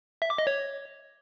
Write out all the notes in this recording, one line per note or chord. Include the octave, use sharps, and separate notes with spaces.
E5
D6
D#5
C#5